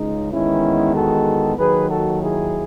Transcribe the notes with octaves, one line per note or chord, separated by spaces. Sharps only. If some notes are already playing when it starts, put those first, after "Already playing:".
Already playing: C#2 C#3 G#3 D#4
E2 D#3 G#3 B3 C#4 E4
F#4 A4
D#2 D#3 F#3 G#4 B4
F#4 A4
E4 G#4